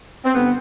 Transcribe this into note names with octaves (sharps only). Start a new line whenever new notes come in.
C4
G2 D3 B3